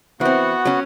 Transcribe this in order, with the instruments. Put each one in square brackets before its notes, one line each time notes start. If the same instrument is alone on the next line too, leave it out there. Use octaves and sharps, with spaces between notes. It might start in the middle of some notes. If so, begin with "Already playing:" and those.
[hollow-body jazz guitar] E3 C4 [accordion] B3 F#4 [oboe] F#5
[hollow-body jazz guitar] F#3 C#4